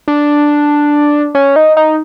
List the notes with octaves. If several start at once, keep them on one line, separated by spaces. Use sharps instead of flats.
D4
C#4
D#4
D#4